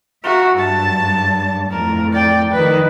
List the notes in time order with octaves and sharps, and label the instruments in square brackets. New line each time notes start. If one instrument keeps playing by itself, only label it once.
[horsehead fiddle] F#4 A#4 [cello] E5
[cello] G2 [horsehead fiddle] A5
[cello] F2 A2 [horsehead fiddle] A#4
[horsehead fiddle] D5 G5
[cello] D#3 F3 [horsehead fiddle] B4